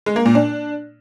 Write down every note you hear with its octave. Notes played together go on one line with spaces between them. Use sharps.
G#3
A#3
A#2
D4